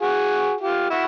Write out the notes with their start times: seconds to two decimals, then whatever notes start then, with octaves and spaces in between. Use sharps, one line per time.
0.01 F#4 G#4
0.60 F4 G4
0.90 E4 F#4